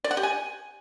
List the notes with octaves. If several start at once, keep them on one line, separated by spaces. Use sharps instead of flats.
D5
F#5
G4
G#5